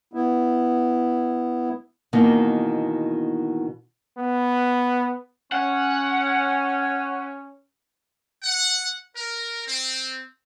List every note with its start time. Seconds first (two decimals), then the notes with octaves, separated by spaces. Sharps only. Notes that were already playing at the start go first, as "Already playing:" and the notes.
0.13 B3 E4
2.13 B2 D#3 E3 A#3
4.18 B3
5.52 C#4 F#5
8.43 F#5
9.15 A#4
9.66 C4